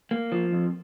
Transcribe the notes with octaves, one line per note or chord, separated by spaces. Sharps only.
A#3
F3
F2